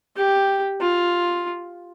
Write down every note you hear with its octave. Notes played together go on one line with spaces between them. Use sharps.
G4
F4